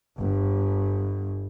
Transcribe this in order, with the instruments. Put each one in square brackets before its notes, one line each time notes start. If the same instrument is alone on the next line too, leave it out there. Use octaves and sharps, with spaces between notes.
[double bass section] G1